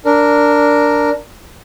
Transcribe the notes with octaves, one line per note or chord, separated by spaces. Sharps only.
D4 A#4